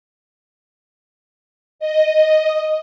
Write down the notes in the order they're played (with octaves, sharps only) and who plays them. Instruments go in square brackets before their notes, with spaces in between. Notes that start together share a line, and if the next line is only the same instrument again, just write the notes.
[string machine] D#5